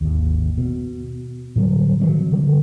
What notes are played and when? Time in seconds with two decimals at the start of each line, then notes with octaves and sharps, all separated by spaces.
0.01 G#1 D#2
0.58 B2
1.56 A2 D3 F#3 G3
2.00 D#3 F3 F#3 C4
2.32 D3 G3